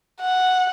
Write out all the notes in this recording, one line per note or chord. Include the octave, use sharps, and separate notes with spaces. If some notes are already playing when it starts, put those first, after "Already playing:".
F#5